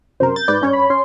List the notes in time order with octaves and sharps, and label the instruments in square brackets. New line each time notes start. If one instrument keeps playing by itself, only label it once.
[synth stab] F#2 C3 A#4 [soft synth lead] C5
[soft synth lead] G6 [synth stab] A6
[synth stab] G#2 B4 D5
G2 C#4 C#5
[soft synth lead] B5
[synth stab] C#4 [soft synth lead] C6